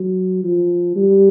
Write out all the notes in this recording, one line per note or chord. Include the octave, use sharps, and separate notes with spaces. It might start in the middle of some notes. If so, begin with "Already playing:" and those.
Already playing: F#3
F3
G3